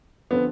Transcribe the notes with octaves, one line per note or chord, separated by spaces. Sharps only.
D3 F3 B3 C4